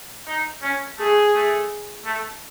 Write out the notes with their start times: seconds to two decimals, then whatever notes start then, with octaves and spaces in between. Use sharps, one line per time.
0.27 D#4
0.63 C#4
0.98 A3 G#4
1.35 A3
2.06 A3